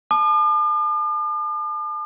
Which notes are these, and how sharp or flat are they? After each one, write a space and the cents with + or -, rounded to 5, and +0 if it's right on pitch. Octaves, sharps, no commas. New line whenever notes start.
A5 -25 D6 +45